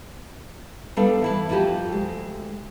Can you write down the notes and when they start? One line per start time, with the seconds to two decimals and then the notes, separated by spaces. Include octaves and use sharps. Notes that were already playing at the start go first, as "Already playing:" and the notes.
0.97 G3 B3 D4 A4 F5
1.22 E3 E4 A5
1.49 F2 F3 A#3 E4 F#4 G4
1.89 D2 G#3